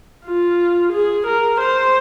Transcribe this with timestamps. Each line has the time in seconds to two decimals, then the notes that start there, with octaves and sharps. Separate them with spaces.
0.25 F4
0.92 G#4
1.26 A#4
1.60 C5